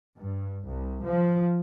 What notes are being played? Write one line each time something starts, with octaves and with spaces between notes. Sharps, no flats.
G2
C2
F3